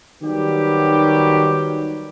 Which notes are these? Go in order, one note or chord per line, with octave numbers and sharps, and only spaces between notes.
D#3 F#3 G3 B3 G4